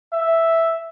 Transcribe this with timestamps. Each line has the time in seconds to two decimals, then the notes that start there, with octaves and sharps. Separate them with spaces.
0.13 E5